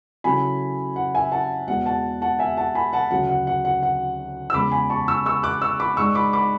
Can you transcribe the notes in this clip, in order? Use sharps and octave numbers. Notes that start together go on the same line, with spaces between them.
C#3 F#3 A3 E4 G#5 B5
F#5
E5 G#5
F#5 A5
E2 B2 G#3 B3 D4 F#5
F#5 A5
F#5 A5
E5 G#5
F#5 A5
G#5 B5
F#5 A5
D2 C#3 F#3 A3 F#5
F#5
F#5
F#5
F#5
E6
E2 C#3 G#3 B5 D6
G#5 B5
A5 C#6
C#6 E6
C#6 E6
D6 F#6
C#6 E6
B5 D6
G#2 G#3 D4 C#6 E6
B5 D6
B5 D6